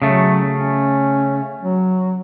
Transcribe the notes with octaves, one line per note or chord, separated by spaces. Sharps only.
C#3 F#3 A3
C#4
F#3